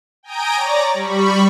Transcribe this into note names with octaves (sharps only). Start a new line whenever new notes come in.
G5 G#5 A#5 D#6 G6 D7
C#5 D5 A#5 D6
G3 B5 C#6